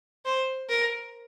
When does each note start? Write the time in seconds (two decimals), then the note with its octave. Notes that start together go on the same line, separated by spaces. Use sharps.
0.25 C5
0.70 A#4